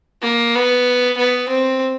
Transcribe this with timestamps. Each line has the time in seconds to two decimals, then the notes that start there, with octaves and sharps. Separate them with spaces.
0.22 A#3
0.55 B3
1.17 B3
1.49 C4